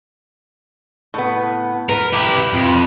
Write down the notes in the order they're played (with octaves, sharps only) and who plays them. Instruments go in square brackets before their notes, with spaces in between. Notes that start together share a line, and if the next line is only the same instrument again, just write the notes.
[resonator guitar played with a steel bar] A2 B3
[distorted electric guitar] A#4 [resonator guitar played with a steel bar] B4
[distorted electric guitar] E4 G4
F2